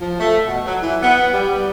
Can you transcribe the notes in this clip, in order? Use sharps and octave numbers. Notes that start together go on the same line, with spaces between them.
F3
A3
B2
F#3
E3
B3
G3